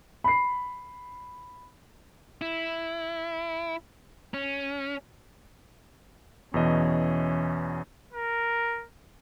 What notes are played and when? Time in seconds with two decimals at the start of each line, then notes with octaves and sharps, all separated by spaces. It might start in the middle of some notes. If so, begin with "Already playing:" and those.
0.24 B5 C7
2.41 E4
4.34 C#4
6.54 E2 B2 E3 C#4 D#5
8.13 A#4